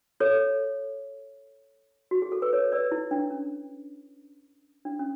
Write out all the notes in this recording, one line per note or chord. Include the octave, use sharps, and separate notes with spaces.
A4 C#5
F#4
G#4
A4
B4
A4 C#5
B4 D5
E4
D4
C#4
D4
C#4